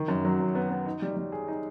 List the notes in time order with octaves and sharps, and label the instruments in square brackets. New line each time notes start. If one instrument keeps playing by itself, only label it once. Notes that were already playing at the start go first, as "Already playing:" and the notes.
Already playing: [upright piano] D#3
F#2
F#3
F#2
B3
B3
D#4
G3
G3
G#4
D#4